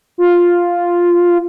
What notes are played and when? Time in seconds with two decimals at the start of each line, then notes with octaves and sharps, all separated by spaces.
0.18 F4